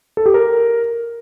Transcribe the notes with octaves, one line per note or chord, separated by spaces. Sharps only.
A4
G4
A#4